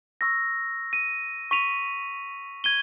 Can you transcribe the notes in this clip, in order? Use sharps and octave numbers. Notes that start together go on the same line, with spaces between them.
C#6 E6 A#6
D#7
C#6 B6 D#7 F7
G#6 D#7 G7